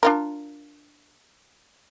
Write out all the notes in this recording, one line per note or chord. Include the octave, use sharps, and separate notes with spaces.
D4 F4 A#4